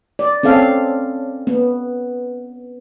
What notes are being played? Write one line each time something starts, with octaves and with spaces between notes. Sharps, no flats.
D5
C4 C#4 A4 F5
B3